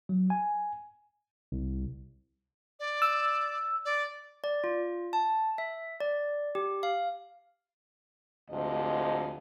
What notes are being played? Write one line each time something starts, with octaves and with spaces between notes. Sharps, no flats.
F#3
G#5
C2
D5
E6
D5
D5
F4
A5
E5
D5
G4
F5
D2 G#2 C3 F3 D#5